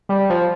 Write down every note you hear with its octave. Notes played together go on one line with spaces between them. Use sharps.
G3
F3